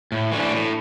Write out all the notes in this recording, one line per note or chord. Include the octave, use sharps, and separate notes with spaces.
A2
E3 A3 D4
A2